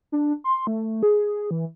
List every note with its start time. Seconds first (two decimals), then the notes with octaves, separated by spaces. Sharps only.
0.12 D4
0.44 C6
0.67 A3
1.03 G#4
1.51 E3